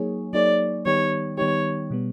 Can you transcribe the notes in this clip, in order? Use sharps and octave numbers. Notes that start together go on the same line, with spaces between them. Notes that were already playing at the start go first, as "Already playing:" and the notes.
Already playing: F#3 A#3 D#4 G#4 C#5
F#3 A#3 D#4 G#4 C#5 D5
D#3 G3 B3 D#4 G4 C#5
D#3 G3 B3 D#4 G4 C#5
B2 G3 B3